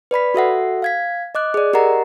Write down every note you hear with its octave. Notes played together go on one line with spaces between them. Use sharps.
B4 D5 B5 B6
F#4 A4 E5 F#5
F5 G#6 B6
D#5 D6 F#6
G#4 D5
G4 A#4 D#5 F#5 A#5